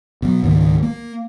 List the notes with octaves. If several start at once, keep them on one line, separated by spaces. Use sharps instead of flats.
B2 F#3
C#2 G#2 D#3 A#3
A#3